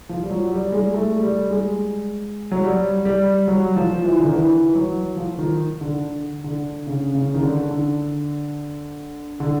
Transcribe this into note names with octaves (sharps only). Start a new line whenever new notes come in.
F3
G3
F#3
G3
G3
G#3
A3
G3
G#3
F#3
G3
G3
F#3
F3
E3
D3
D#3
E3
F#3
F3
D#3
D3
D3
C#3
C#3
D#3
D3
D3
D3